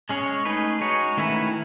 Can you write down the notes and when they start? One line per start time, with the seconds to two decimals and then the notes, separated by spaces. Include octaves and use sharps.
0.09 G#3 C#4 G#4 C#5
0.45 A3 D#4 G#4 B4
0.81 G#3 D#4 F#4 C#5
1.17 D#3 A3 C#4 E4 B4